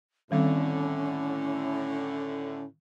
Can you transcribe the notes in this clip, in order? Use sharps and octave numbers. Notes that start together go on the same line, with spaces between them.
A2 D3 D#3 G3 C4 C#4